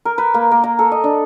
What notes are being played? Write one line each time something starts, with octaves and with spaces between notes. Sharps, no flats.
A#4
B4
A#3
A#3
A#5
A4
D#5
D4